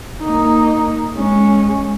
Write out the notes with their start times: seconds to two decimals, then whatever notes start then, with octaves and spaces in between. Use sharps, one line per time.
0.23 A#3 D#4
1.15 G#3 C#4